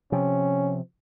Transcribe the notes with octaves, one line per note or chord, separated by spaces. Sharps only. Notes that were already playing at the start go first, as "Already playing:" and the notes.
C3 F3 C#4